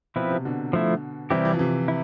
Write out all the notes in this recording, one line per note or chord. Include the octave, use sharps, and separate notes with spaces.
B2 F3 C4 E4 B4
C3
B2 D3
F3 A3 E4
C3 E3 G3 C4 E4 G4
E3
F3
C3 E3
E4